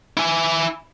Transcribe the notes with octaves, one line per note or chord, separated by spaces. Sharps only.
E4 G#5